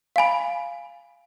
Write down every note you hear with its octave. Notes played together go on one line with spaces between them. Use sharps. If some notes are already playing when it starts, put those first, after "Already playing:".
F5 G#5 B5